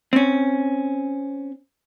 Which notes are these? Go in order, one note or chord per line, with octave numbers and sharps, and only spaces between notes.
C4 C#4